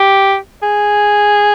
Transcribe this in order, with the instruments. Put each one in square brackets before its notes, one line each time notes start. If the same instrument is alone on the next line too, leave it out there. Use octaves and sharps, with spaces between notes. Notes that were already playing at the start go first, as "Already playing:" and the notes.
Already playing: [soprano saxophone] G4
G#4